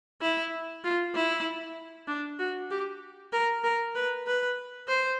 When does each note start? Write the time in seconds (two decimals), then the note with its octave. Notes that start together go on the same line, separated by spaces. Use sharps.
0.22 E4
0.84 F4
1.15 E4
2.08 D4
2.39 F#4
2.71 G4
3.33 A#4
3.64 A#4
3.95 B4
4.27 B4
4.88 C5